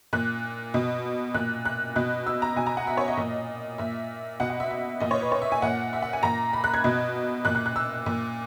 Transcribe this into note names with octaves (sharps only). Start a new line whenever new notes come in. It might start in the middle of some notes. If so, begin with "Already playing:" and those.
A#2 F#6
B2
A#2 F#6
F#6
B2 F#6
E6
A#5
B2 G#5
A#5
F#5
E5
C#5
D#5
A#2
A#2 E5
B2 F#5
F#5
E5
E5
A#2 D#5
C#5
B4
C#5
E5
G#5
A#2 F#5
E5
F#5
G#5
A#2 A#5
B5
F#6
G#6
B2
A#2 F#6
F#6
F#6
E6
A#2